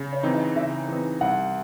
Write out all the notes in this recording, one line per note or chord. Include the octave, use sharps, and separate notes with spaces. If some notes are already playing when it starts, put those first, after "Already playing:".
Already playing: C#3
C#5
E3 C4 D#4
D#5
C#3 E5
E3 C4 D#4
C2 F#5